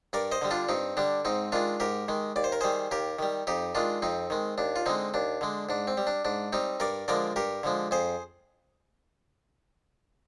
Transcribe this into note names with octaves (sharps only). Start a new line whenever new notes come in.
G2 A#4 D5
C5 D#5
D3 G3
D4 F4
G2 C4 D#4
D3 G3 D4
G#2 C4 D#4
D#3 G#3 D4 F4
G#2 G4 A#4
D#3 G#3
D#2 D5
C5
A#4
D#3 G3 G#4 C5
D#2 G4 A#4
D#3 G3
F2 D#4 G4
D#3 G#3 D4 F4
F2 C4 D#4
D#3 G#3
D#2 D4
F4
D3 G#3 C4 D#4
D#2 D4
D3 G#3
G#2 D4
C4
G3
D4
G#2 D4
G3 C4 D#4
G2 A#4 D5
D3 F3 G#3 A#4 D5
G2 G4 A#4
D3 F3 G#3
F2 G#4 C5